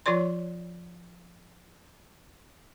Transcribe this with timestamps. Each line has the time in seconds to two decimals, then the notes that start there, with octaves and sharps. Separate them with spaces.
0.06 F3 F4 C#5 D5 C6